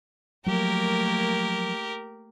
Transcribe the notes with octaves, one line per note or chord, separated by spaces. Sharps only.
F3 F#3 A3 A#3 G4 A#4